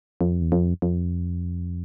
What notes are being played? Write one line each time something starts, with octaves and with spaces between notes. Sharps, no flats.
F2
E2
F2
F2